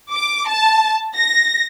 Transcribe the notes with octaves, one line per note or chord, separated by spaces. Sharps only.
D6
A5
A#6